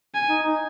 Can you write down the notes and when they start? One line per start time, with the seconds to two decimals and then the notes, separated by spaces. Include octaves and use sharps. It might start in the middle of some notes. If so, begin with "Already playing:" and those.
0.15 G#5
0.29 D#4
0.43 D#4